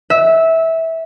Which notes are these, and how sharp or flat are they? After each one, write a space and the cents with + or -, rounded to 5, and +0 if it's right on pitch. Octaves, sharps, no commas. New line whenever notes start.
E5 -15